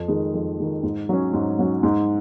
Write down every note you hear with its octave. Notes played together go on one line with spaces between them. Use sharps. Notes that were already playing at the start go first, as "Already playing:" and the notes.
Already playing: F2
D#3 G#3
F2
D#3 G#3
G#2
F#3 C#4
G#2
F#3 C#4
G#2